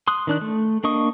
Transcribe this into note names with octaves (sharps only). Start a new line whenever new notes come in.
C6 D#6 F#6
D#3 D4 F#6
A3
A#3 D4 D#5 C#6 D#6